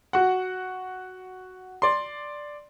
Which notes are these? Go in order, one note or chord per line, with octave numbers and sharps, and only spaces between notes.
F#4 F#5
D5 C6